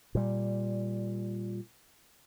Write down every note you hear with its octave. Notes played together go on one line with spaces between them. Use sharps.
A#2 G3